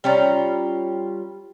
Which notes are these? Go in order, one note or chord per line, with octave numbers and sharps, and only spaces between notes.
G3 C#4 F4 A#5